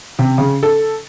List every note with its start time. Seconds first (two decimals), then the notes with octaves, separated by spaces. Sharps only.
0.19 C3
0.38 C#3
0.63 A4